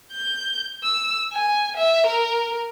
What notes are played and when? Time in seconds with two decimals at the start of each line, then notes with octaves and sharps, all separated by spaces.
0.12 G6
0.83 E6
1.33 G#5
1.76 E5
2.07 A#4